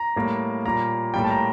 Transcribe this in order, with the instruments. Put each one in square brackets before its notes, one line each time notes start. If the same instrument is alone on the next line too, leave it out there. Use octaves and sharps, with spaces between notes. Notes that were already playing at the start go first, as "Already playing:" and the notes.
Already playing: [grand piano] A#5
A2 G3 A#3
A#2 G3 A#3 A#5
A2 G3 A#3 G5
A5
A#5